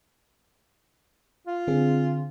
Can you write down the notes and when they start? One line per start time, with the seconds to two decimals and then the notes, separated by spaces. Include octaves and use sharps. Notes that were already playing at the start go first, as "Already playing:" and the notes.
1.47 F4
1.67 D3 C4 G#4